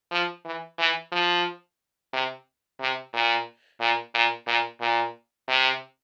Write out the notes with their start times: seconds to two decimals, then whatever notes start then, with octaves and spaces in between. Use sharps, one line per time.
0.11 F3
0.45 E3
0.79 E3
1.12 F3
2.13 C3
2.80 C3
3.13 A#2
3.81 A#2
4.14 A#2
4.47 A#2
4.81 A#2
5.48 C3